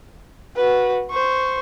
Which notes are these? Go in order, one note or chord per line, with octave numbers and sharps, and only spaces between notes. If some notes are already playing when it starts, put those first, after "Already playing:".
F#4 B4
C5 C#6